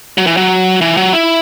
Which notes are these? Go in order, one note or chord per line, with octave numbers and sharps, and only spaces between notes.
F#3
E3
F#3
E3
F#3
E4